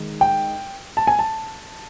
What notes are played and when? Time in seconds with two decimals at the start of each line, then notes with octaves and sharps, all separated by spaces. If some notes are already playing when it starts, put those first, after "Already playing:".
Already playing: D#3 G#3
0.21 G5
0.97 A5
1.07 G#5
1.19 A5